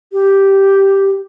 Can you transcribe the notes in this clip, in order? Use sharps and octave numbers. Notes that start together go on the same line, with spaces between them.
G4